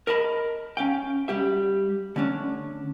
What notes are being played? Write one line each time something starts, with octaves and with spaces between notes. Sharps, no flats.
A#4 D#5 A5 B5
C#4 F5 G5
G3 G4 E5
D3 A3 C#4 D4